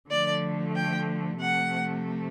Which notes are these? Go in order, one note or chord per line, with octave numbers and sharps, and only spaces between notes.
D3 F3 A3 D5
G5
C3 F3 A3 F#5